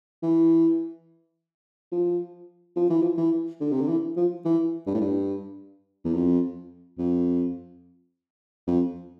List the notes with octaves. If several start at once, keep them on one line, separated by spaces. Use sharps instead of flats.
E3
F3
F3
E3
F3
E3
D3
C3
D3
E3
F3
E3
G2
A2
G2
E2
F2
F2
F2